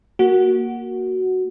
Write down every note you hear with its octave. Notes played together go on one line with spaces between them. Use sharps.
A#3 F#4